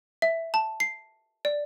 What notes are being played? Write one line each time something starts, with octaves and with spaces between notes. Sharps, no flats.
E5
A5
C7
D5